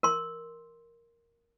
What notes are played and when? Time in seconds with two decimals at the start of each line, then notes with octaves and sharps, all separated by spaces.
0.03 A#4 C6